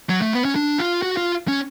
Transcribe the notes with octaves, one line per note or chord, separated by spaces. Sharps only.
F#3
A3
B3
C#4
D4
F4
F#4
F4
C#4